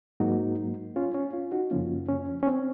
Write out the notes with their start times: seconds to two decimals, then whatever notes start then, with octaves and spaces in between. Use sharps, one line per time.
0.20 G#2 F#3 A#3 D#4 F#4
0.96 C#4 F4
1.14 C#4
1.33 C#4 F4
1.52 D#4 F#4
1.71 F#2 C#3 F3 A#3 C#4 F4
2.09 C#4
2.43 C#4
2.47 C4